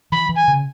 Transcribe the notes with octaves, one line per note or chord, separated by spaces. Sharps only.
E3 B5
E3
G#5
C#3